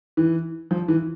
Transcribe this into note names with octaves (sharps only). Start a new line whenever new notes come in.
E3
F3
E3